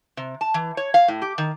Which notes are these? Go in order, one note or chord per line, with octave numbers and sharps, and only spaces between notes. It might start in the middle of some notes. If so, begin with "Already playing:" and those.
C3
A5
E3
C#5
F5
A2
G4
D#3